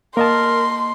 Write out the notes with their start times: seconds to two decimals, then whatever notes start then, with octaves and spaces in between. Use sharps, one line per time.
0.17 A#3 A#4 D#5 A5 C6